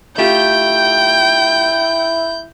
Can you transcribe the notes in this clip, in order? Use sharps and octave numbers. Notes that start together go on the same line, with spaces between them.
A3 E4 F4 G4 G5 G6